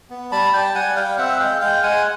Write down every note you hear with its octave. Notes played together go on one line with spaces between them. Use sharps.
B3
G3 A5 B5
G3 G5 A5
G3 F#5 G#5
G3 F5 G5
C4 E5 F#5
G#3 F5 G5
G#3 F5 G5
G#3 F#5 G#5